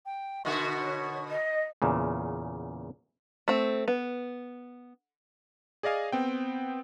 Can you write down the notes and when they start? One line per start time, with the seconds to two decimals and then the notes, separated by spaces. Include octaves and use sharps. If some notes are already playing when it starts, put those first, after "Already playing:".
0.06 G5
0.45 B2 D3 F#4 C#6
0.81 C#5
1.28 D#5
1.82 E2 A#2 C#3
3.48 A3 C4
3.88 B3
5.83 G#4 D5 D#5 F5 G#5
6.12 B3 C4 G5